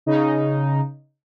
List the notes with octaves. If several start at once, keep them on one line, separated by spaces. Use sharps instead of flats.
C#3 D#4